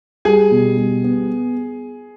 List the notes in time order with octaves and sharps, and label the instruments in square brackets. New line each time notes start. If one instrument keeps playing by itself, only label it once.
[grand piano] G3 [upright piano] G#4 G#5
[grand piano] B2
G3
B3